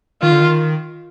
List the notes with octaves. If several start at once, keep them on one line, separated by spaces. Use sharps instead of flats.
D#3 F4
D3
D#3